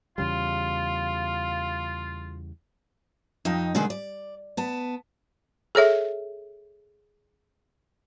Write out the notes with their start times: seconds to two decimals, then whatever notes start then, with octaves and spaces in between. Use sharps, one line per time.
0.18 E2 C#3 G3 F4 F5
3.45 F2 D#4 D#5 G5
3.75 B2 D3 D#3 G#3 G#4 D5
3.90 D5
4.57 B3 A5
5.75 G#4 A4 C#5 E5